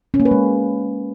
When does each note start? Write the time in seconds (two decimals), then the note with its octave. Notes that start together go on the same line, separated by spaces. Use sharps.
0.14 C#4
0.20 A#3
0.25 B4
0.31 G#3